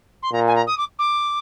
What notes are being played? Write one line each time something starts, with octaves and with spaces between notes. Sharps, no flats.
C6
A#2 A#5
G#5
A#5
D#6
D6
D6